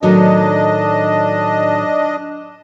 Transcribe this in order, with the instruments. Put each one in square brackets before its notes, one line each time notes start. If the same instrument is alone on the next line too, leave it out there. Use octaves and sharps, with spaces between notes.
[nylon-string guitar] A2 D#3 F#3 [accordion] D4 D#5